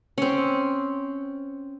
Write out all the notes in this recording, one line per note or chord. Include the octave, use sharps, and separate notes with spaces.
C4 C#4